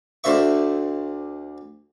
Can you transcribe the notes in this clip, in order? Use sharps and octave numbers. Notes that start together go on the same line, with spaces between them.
D2 D3 C5 E5 C#6